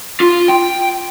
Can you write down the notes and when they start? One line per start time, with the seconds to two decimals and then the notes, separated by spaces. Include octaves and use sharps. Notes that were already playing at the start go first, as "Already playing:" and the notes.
0.21 F4
0.49 G5